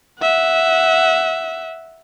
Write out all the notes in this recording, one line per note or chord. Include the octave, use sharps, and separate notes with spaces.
E5 F#5